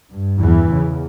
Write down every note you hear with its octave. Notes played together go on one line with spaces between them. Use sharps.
G2
E2 E3
E2 C#3